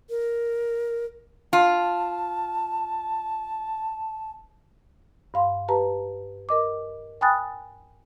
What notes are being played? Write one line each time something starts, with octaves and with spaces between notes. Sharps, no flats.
A#4
F4 A5
G2 F5 C6
G4 B4 A5 A#5
A#4 D#5 D6
G5 G#5 B5 D#6 F#6 A6